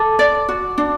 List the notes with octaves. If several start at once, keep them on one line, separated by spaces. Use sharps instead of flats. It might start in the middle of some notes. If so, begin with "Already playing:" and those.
Already playing: A4 D6
D5
F#4
D4